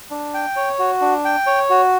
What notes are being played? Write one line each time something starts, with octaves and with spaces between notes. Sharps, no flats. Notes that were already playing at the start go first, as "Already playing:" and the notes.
D4
G5
C#5
F#4
D4
G5
C#5
F#4